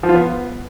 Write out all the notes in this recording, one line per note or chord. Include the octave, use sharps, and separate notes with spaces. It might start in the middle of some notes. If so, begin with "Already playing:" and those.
F3
F4
B3